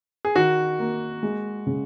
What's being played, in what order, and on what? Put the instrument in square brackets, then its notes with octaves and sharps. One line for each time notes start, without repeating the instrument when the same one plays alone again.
[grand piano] G#4
[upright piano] D#3 [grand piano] F#4
[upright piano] A#3
G#3
C#3